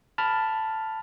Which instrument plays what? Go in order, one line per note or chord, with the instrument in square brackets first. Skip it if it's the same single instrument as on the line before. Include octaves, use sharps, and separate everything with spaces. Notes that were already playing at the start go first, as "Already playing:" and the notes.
[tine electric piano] A5 B5 F6